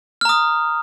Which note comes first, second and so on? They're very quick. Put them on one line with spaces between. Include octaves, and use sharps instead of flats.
F6 A#5 D#6